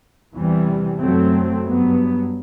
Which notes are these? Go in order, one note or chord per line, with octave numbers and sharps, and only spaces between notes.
E2 C3 E3 G3
F#2 F#3 A3 C4
G2 F#3 B3